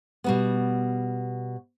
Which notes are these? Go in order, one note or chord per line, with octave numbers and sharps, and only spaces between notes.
B2 G3 B3